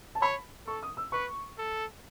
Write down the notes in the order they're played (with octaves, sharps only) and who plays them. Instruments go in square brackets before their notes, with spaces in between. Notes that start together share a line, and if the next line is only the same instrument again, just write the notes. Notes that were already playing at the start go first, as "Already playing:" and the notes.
[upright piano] A5
[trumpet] C#5 [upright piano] B5
[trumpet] A4 [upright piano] C#6
[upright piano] D#6
E6
[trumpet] B4 [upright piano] C#6
[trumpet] A4